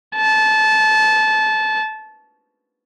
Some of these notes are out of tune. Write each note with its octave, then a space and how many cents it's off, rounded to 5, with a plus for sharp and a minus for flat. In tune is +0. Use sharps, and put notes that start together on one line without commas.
A5 -20